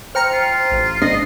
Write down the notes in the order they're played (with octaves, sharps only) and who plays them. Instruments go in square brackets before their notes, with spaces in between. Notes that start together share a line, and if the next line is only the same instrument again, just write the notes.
[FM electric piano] C5 G5 A#5 [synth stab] F6 C#7
[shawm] F4
[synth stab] A1
[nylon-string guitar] D4 [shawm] D#5 [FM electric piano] C7